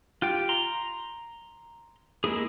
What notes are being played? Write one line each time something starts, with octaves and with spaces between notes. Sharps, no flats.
F4 G4 G5
A#5 C6
G#3 A#3 E4 G#4